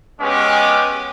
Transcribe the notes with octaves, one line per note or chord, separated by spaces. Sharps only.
G#3 B3 C#4 G4 B4 D6